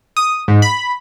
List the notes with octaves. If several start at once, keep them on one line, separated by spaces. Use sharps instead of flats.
D#6
G#2
B5